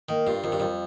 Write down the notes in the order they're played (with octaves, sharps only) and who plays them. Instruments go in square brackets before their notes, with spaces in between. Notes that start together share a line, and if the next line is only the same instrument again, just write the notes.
[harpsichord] D#3 [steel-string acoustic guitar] A#3
[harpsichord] G2 [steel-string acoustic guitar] F4
[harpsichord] F2 [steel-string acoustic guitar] D#3
[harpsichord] G2
[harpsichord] F2 [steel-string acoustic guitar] G3